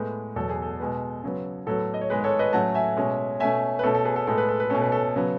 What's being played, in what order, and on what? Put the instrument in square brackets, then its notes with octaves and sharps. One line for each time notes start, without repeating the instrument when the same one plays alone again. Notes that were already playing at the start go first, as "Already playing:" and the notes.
Already playing: [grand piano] A2 G#3 B3
E2 B2 F#3 A4
G#4
A4
B2 G#3 B3
C#3 F#3 B3
A2 F#3 B3 A4
D#5
C#5
G#2 D#3 G#3 B3 G#4 B4
A4 C#5
B4 D#5
A2 F#3 A3 C#4 F#5 A5
E5 G#5
B2 G#3 C#4
B2 A3 C#4 E5 G#5
B4
B2 A3 C#4 A4
A4
G#4 B4
A4
A2 G#3 B3 A4
B4
A4
B4
B2 A3 C#4 A4
B4
A4
C#3 F#3 B3